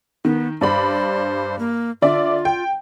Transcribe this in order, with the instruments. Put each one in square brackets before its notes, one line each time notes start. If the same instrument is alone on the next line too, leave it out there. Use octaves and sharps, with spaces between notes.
[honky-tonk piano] D#3 [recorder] B3
[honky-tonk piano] G2 D5 B5 [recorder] C5
[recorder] A#3
[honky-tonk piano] D3 D5 E5 [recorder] F4
[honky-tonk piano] G5